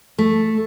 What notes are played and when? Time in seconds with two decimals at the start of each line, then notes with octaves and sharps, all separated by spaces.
0.18 A3